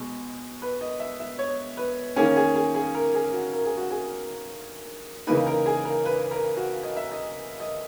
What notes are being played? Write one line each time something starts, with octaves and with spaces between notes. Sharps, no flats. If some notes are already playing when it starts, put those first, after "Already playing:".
Already playing: B2 G#3
B4
D#5
E5
E5
C#5
B4
D#3 A#3 C#4 G#4
G#4
G#4
G#4
A#4
G#4
F#4
A#4
G#4
F#4
G#4
C#3 E3 A#3 D#4 B4
A#4
G#4
A#4
B4
A#4
F#4
D#5
E5
D#5
D#5